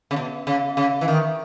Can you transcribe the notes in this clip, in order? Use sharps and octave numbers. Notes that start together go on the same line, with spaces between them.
C#3
B2
C#3
C#3
E3
D#3